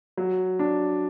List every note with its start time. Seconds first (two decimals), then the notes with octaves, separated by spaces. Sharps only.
0.17 F#3
0.59 D4